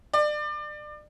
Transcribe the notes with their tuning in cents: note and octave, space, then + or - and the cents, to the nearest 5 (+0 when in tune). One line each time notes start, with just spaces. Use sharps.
D5 +30